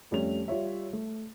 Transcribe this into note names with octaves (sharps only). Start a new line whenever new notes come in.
F2 G3 A3 C#4 F7
G3 F4 C#5 E5
A3